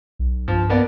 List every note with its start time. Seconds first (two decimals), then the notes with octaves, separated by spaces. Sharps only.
0.19 B1
0.48 G2 F3
0.70 A#3 B3 D5